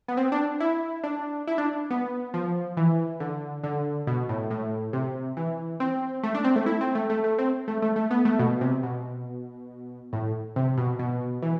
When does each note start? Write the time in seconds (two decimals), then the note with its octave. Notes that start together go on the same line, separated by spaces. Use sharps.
0.08 B3
0.17 C4
0.32 D4
0.60 E4
1.04 D4
1.47 E4
1.58 D4
1.90 B3
2.34 F3
2.77 E3
3.20 D3
3.64 D3
4.07 B2
4.29 A2
4.51 A2
4.93 C3
5.37 E3
5.80 C4
6.23 A3
6.35 D4
6.45 C4
6.56 A3
6.66 E4
6.81 C4
6.95 A3
7.10 A3
7.24 A3
7.38 C4
7.68 A3
7.82 A3
7.96 A3
8.11 B3
8.25 A3
8.39 B2
8.61 C3
8.83 B2
10.13 A2
10.56 C3
10.77 B2
10.99 B2
11.42 E3